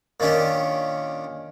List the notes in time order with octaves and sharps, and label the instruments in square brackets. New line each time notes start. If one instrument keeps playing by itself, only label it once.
[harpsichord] A#2 D#3 C#4 D4 G4